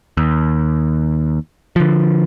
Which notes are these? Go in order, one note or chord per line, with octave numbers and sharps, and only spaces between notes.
D#2
D3 F3